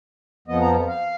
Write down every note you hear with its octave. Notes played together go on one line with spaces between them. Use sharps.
F2 F3 B3 D#5
A#5
F5